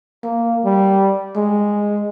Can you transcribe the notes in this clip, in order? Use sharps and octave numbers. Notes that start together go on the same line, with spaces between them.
A#3
G3
G#3